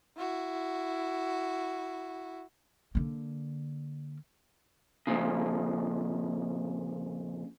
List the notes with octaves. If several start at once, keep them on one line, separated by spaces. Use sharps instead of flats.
E4 F#4
D3 A#3
F2 A#2 C#3